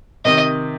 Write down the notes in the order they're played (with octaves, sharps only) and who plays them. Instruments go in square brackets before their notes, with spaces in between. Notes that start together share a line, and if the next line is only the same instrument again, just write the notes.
[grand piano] C3 D#3 [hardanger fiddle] D#5